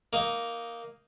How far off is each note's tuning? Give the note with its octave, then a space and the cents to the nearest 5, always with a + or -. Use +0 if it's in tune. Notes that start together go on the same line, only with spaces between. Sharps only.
A#3 +0 D#4 +0